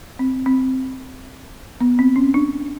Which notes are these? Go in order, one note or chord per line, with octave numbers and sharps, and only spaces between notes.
C4
C4
B3
C4
C#4
D4